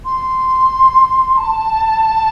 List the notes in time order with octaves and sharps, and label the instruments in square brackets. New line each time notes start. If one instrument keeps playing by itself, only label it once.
[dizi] C6
A5